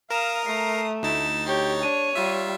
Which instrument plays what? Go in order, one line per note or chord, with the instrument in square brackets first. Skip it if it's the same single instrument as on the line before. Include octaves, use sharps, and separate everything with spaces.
[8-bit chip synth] A#4 [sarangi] F5 [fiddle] A#5 D#6 [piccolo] E7
[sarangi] A3 [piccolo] C7
[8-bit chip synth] D2 D#4 A6 [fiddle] E4 [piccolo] E7
[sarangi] G4 [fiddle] C#5 [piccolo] G6
[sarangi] D4 [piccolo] D#7
[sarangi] G3 [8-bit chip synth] F4 E5